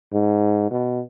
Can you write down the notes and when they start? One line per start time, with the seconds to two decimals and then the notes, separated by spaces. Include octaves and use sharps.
0.13 G#2
0.70 B2